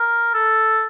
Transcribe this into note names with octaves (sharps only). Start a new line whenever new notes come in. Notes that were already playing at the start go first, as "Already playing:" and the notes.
Already playing: A#4
A4